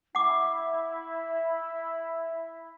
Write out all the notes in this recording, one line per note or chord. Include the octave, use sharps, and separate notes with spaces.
E4 E5 F#5 D6